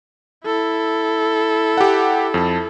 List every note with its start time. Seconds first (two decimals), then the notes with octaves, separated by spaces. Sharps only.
0.45 E4 A4
1.77 G4 F#5
2.34 F2 A5